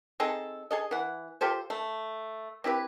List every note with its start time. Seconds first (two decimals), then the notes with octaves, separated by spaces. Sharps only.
0.20 C4 D#4 G#4 A4
0.71 G#4 A4 D#5
0.91 E3 F#5
1.41 F4 G4 A4 C5
1.70 A3
2.64 C4 E4 G4 B4